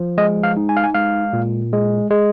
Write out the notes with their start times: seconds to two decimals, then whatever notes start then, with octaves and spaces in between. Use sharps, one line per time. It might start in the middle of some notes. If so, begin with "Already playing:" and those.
Already playing: F3
0.18 G#3 D#5
0.43 F5
0.57 D#4
0.69 G#5
0.76 F5
0.84 G#5
0.94 G#3 F5
1.33 A#2
1.73 G#3
2.10 G#3